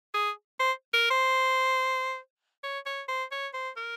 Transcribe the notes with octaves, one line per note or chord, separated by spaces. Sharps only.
G#4
C5
A#4
C5
C#5
C#5
C5
C#5
C5
A#4